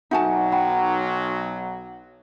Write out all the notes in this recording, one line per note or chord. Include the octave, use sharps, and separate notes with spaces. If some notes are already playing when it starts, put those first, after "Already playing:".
B1 F#3 D#4 F#4 E5 F#5 G#5 A5
F#5 G5 B5